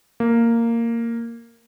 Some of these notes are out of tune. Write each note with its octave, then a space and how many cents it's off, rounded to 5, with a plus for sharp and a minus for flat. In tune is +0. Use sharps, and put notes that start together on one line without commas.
A#3 -10